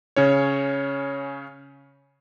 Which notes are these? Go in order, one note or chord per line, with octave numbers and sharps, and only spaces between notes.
C#3 C#4 C#5